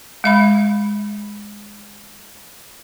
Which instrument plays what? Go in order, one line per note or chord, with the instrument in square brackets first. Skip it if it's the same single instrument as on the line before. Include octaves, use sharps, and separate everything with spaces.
[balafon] G#3 E5 B5